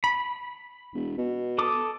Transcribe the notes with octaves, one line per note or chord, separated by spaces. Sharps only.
B5
E1
B2
A4 D6 D#6